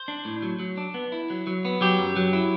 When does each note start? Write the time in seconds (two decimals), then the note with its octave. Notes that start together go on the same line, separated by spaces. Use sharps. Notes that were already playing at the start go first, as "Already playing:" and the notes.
Already playing: C5
0.08 D4
0.25 A2
0.42 F#3
0.59 F#3
0.77 D4
0.94 B3
1.12 E4
1.30 F#3
1.47 F#3
1.65 B3
1.81 F#3 G4
1.99 F#2
2.16 F#3
2.33 E4